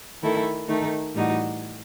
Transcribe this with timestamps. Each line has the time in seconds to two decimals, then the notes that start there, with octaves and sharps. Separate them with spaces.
0.23 D#3 A3 E4 A4
0.69 D#3 A3 D#4
1.15 A2 E3 G3 D#4 F#4